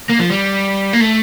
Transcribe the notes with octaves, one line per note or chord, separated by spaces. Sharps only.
A#3
F3
G3
A#3
A3